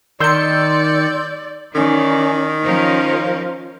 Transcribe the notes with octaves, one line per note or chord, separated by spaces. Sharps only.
D#3 D5 C6 E6 G6 C#7
D#3 E3 C#4 D#4 D5
F3 C#4 F4 A#4 C5 F5